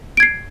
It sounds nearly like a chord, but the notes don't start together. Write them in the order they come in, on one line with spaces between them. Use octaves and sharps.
D7 G#6 C7